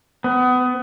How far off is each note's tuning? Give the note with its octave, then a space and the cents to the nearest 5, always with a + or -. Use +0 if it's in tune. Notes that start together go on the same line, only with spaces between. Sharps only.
B3 +25